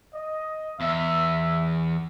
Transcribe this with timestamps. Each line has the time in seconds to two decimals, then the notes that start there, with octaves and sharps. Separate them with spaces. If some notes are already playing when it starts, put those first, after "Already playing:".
0.15 D#5
0.80 E2 E5